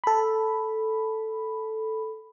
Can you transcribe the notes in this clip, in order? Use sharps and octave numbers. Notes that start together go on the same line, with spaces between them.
A4 B5